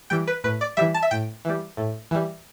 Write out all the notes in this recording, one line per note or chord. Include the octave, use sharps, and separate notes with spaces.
E3 G3 G5
B4
A2 B4
D5
E3 G3 E5
A5
E5
A2 G5
E3 G3
A2
E3 G3